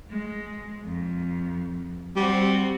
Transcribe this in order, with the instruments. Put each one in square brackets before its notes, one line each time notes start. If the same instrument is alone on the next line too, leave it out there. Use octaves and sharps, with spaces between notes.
[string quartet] G#3
F2
[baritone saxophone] G3 [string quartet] C4 F#4